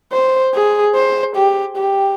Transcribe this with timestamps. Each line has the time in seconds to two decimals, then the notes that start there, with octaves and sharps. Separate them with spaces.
0.12 C5
0.54 G#4
0.95 C5
1.36 G4
1.77 G4